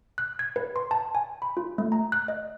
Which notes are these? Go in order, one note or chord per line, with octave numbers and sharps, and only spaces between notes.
F#6
G#6
B4
C6
A5
G#5
B5
F4
A3
A#5
F#6
D#5